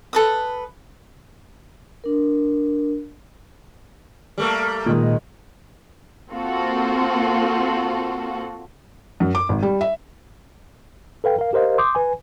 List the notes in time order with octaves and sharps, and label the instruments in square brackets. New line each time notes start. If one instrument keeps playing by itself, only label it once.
[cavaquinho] A4 B4 D#6
[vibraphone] D4 A#4
[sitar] G3 A3 A#3
[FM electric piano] A#2 [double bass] D#3 G#3
[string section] A#3 C4 F4 F#4 A4
[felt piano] F#2
D6
G#1
G3
E5
[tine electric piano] A4 B4 F5 G5
A#4 F5
G4 A#4 C5 D#5 F5
C6 D6 D#6 G6
B4 G#5